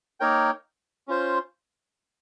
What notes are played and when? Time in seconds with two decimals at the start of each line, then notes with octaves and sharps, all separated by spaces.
0.20 A#3 D#4 A#4 C#5 G5
1.08 C#4 F4 C5